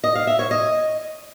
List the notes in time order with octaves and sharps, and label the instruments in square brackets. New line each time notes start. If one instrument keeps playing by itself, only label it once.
[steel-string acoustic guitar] D#5
F5
E5
C#5
D#5